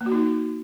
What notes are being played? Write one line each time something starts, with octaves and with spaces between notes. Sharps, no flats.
A#3
F#4
D#4